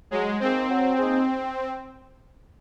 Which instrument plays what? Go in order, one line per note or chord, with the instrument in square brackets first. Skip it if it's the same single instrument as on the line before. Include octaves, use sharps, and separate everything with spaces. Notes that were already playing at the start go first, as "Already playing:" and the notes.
[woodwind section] F#3 [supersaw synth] G#3
[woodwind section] A#3 D#4 G#4 C5 [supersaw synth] C4
[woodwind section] F#3
A#3 D#4 G#4 C5